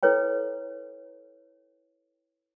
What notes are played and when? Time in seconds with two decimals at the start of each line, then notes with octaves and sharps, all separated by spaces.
0.03 E4 A4 B4 C#5 G5